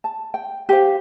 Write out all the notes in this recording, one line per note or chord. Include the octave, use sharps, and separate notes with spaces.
A5
G5
G4 C5 F5